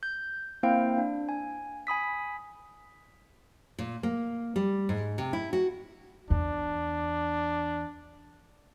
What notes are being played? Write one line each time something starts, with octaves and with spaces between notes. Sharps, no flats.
G6
A#3 C4 E4 C5 F5 G5
D4
G#5
G#5 B5 D#6 B6
A#2
A#3
G3
G#2
C3
E4
F#4
E2 D4